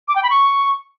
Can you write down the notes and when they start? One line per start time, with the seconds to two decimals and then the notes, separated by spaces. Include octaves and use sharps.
0.08 D6
0.16 G5
0.23 B5
0.30 C#6